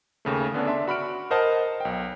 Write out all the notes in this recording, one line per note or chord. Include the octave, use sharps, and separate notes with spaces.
D#2 C#3 A3
D3 B3 C#4 D4
D4 E5 A5 C6
F#4 B5 F6 D7
A#4 C5 D#5 F#5 A5
B1 G5